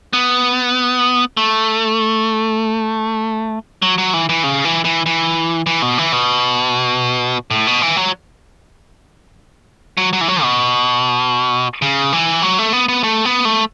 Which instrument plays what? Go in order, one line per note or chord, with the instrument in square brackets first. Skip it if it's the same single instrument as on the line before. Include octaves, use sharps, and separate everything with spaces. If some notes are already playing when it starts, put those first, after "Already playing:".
[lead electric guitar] B3
A3
F#3
F#3
E3
E3
C#3
E3
E3
E3
E3
B2
E3
B2
A2
B2
E3
F#3
F#3
F#3
E3
F#3
B2
C#3
E3
F#3
A3
B3
B3
A3
B3
A3